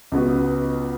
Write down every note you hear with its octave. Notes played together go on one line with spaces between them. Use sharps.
C#2 C#3 B3 F#4